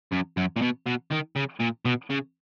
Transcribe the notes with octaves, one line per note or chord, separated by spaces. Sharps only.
F#2
F#2
A#2
B2
B2
D#3
C#3
A#2
B2
C#3